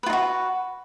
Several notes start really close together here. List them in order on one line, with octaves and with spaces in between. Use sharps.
B4 F4 D#4 F#4